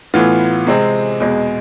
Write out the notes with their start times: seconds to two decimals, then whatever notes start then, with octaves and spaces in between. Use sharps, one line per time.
0.14 A2 E3 B3 F4
0.67 C3 G#3 C4
1.20 E2 B2 G#3